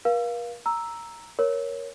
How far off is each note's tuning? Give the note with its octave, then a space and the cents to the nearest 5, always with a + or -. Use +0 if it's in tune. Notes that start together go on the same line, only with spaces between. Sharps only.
A#4 +45 F5 +0
A#5 +0 E6 +0
A#4 +10 C#5 +0